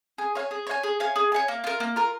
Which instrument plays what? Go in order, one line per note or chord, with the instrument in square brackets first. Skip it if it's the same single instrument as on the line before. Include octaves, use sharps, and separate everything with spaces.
[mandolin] G#4
C#5 F5 G#5
G#4
C#5 F5 G#5
G#4
C#5 F5 G#5
G#4
C#5 F5 G#5
A#3
F4 A#4
A#3
F4 A#4